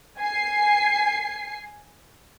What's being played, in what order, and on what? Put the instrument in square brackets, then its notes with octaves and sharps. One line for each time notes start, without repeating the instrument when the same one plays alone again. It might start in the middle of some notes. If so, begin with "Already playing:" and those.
[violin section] G#5 C7